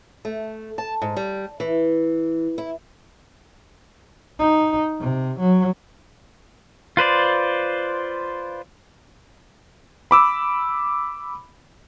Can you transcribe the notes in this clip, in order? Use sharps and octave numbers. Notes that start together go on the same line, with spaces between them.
A3
A5
G#2
G3
E3
E4
D#4
C3
F#3
F4 B4 C5 D5
B5 D6 E6